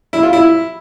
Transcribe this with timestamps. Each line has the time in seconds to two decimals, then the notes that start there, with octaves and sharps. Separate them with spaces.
0.13 E4
0.23 F4
0.33 E4